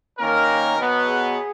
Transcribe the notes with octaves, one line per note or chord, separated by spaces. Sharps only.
D#3 A#3 C#4 A#4
B2 F#3 B3
G#4